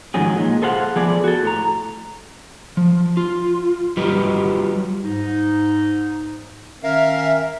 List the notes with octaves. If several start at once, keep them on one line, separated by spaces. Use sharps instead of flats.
G#2 D#3 F3 F#3 C#4 G#4
A#2 G#3
G#4 A4 C5 F5 F#5
F3 A3 B3 G#4 D5
F#4 A4
A2 A#5
F3
F4
F#3 G3 F4 G4 B4 D#5
G#2 D#4
D#3 C#4 A#4 E5 F5